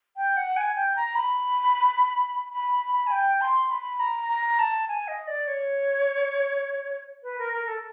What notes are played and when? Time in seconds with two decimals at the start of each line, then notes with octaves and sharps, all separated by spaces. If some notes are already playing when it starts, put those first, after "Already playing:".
0.17 G5
0.37 F#5
0.57 G#5
0.76 G5
0.96 A#5
1.15 B5
2.53 B5
2.72 B5
2.92 B5
3.07 G#5
3.12 G5
3.41 C6
3.71 B5
4.00 A#5
4.29 A#5
4.59 A5
4.88 G#5
5.08 D#5
5.27 D5
5.47 C#5
7.23 B4
7.38 A#4
7.53 A#4
7.67 A4